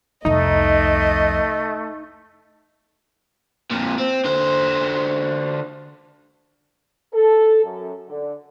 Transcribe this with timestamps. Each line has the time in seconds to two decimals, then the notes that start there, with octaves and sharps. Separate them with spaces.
0.25 C2 F2 A3 D#4 D#5
3.71 F2 A#2
3.98 C4
4.25 D3 C5
7.13 A4
7.64 F#2
8.09 D3